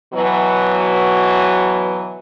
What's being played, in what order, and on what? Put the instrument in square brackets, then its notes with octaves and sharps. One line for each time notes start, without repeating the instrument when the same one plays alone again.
[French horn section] B2 E3 F#3